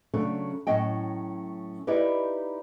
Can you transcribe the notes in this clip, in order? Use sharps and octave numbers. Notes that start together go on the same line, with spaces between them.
C#3 F#3 A3 C#4 D4
A2 F#3 C#4 D#5 G5
D#4 E4 G4 B4 D5 D#5